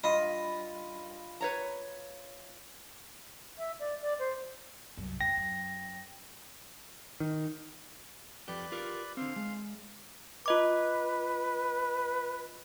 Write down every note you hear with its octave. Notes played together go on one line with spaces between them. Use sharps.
G2 F4 D#5 B5
B4 C#5 A#5
E5
D5
D5
C5
C2 F#2
D#2 G5 A#6
F#2
D#3
F2 G4 B4 D5 F#6
F4 G4 A#4
D3 C4 F5 C6
G#3
F4 B4 D#5 D6